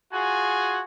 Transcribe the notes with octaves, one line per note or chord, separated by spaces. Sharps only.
F4 F#4 G#4 G#5